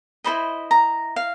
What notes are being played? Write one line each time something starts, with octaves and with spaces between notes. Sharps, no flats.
E4 A4 C5 D#5 B5
A#5
F5